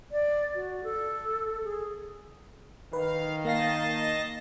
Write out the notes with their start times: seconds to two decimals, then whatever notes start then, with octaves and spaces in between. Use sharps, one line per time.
0.12 D5
0.55 F#4
0.83 A4
1.64 G#4
2.93 D#3 B4 F5
3.45 A#3 D#5 F5 A5 A#6 C7